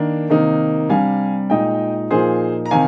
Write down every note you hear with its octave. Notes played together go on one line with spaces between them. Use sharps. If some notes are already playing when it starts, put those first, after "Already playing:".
Already playing: D#3 A#3 D4
C3 D#3 A#3 D#4
C3 G3 D4 F5 G#5
A#2 G#3 D#4 D#5 G5
A#2 F3 A#3 D#4 G#4 C5
A#5
C3 D#3 F5 G#5